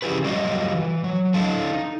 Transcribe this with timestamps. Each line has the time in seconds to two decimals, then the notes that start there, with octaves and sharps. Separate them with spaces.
0.02 C#3 F3 E4 G4 G#4 B4
0.24 F#3 G3 D4 F4 F#4 D#5
0.75 E3
1.04 F#3
1.34 D4 E4 A4 D#5 F5 A5
1.73 D#4